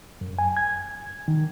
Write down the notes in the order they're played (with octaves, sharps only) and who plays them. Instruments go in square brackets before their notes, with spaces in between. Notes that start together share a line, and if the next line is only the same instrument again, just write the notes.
[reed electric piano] F#2
G#5
G#6
D#3